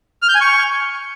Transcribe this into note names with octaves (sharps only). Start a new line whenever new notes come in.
F6
G6
G#5
C#6